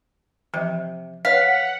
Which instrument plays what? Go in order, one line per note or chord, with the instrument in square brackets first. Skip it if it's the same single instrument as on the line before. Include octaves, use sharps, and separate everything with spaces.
[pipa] C3 [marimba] E3 F3
[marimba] B4 C#5 [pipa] F5 [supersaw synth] F#5 [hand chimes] B6